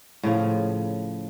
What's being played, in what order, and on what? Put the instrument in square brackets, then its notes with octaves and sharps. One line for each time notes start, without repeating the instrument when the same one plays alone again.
[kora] A2 C#3 F3